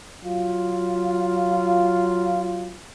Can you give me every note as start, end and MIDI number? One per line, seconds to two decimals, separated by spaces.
0.25 2.77 54
0.25 2.77 65